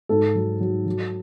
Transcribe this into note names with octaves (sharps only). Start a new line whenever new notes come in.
G#2 A4
F#3
F#3
F#3